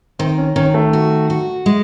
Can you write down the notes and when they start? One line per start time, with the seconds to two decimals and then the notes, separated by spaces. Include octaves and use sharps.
0.19 D#3 C4
0.38 C#4
0.56 D#3 C#4
0.74 A3
0.93 F#4
1.30 F#4
1.66 G#3